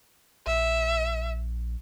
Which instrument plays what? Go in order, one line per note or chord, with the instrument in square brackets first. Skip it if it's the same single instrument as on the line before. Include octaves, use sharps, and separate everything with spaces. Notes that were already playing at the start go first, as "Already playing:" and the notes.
[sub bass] A#1 [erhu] E5